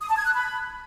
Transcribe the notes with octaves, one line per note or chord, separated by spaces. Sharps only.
D#6
A5
G#6
F#6
B5